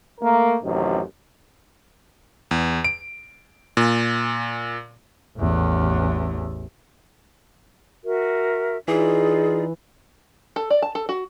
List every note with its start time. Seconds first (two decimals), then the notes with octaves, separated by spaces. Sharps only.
0.21 A3 A#3 A#4
0.63 A1 F#2 C3 D#3
2.51 E2
2.84 D7
3.77 A#2
5.38 A1 E2
8.05 F#4 A#4 E5
8.88 E3 D#4 F4 G#4 D5
10.56 A4
10.70 D5
10.82 A5
10.95 A4
11.09 F#4